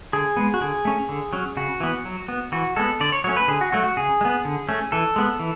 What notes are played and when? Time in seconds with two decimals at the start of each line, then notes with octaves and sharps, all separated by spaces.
0.13 D3 G#4
0.37 G#3 B3
0.54 F#4
0.61 D3 G#4
0.85 A3 C#4
1.09 D3
1.33 F#3 C#4
1.57 C#3 F#4
1.80 E3 B3
2.05 F#3
2.28 B3
2.52 E3 F#4
2.76 G#3 B3 A4
3.00 D3 D5
3.12 C#5
3.24 F#3 A3 C#4 C#5
3.37 B4
3.48 D3 G#4
3.61 F#4
3.72 F#3 A3 F#4
3.84 F#4
3.97 C#3 G#4
4.21 G#3
4.25 B3
4.45 D3
4.69 A3 C#4
4.92 E3 A4
5.16 G#3 B3
5.40 E3